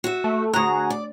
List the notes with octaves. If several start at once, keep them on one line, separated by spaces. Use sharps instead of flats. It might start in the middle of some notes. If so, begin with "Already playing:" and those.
F#4 E5
A3
D2 F#4 G#4 A#5
D5